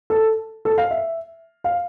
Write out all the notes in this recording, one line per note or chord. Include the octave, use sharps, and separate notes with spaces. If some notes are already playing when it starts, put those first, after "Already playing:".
A4
A4
F5
E5
F5